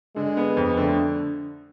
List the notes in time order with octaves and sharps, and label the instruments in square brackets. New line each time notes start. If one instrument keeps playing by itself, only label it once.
[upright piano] D3 [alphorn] G#3
[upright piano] B3
F2
[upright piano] D3 [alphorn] A3